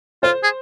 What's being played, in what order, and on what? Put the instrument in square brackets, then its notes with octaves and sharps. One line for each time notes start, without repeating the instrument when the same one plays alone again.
[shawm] F4 [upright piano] C5
[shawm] G#4